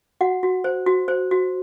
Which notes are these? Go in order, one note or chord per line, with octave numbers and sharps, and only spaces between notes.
F#4 F#5
F#4
C5
F#4
C5
F#4